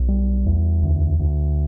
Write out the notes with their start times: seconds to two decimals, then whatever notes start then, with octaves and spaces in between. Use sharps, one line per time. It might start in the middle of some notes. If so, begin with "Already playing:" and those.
Already playing: B1
0.08 G3
0.46 E2
0.83 D2
1.19 D2